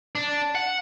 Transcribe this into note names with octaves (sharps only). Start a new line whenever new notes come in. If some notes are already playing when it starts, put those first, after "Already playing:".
D4
F#5